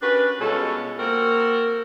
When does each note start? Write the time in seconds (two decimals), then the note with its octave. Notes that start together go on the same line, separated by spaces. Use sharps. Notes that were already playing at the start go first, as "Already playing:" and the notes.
0.02 C#4 D4 F#4 G4 A#4 B4
0.40 B2 G3 G#3 C#4 F4 A4
0.99 A#3 C4 F#4 A4 A#4